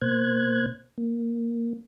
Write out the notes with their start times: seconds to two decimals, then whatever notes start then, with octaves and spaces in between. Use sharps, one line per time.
0.01 B2 A#3 C5 F#6 G#6
0.98 A#3